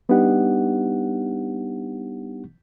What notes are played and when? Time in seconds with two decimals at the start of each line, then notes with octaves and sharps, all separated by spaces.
0.09 G3 B3 D4 D#4 G4 F#5